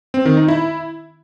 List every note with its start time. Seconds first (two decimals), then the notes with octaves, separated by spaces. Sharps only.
0.14 C4
0.25 D#3
0.37 D#4
0.48 E4